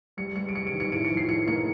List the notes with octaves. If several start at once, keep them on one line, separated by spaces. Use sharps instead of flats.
G3 C#7
G3 C#7
D7
G3 C#7
D7
D#3
C#7
A2 D7
C#7
F3
C7
A2 C#7
A#3 C#7